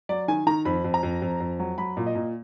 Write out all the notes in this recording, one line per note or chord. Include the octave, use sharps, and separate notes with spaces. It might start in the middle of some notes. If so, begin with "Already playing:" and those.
F#3 D5
D#3 G#5
D#3 A#5
F2 B5
F2
A#5
F2
F2
F2
F#3
F#3 B5
A#2
D#5
A#2